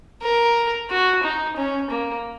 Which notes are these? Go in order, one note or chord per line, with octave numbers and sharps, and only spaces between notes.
A#4
F#4
D#4
C#4
A#3